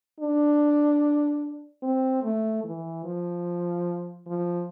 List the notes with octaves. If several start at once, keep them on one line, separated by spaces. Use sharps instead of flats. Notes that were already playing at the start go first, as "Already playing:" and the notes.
D4
C4
A3
E3
F3
F3